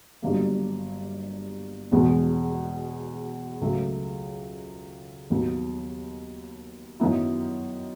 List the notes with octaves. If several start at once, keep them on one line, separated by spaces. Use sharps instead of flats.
G1 G2 D#3 F#3 A#3
E1 E2 B2 G#3 B3
C#2 C#3 F#3 A3
D#2 D#3 F#3 B3
F#2 D#3 F#3 B3 E4